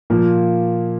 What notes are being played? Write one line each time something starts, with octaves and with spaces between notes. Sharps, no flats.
A#2 F3 A#3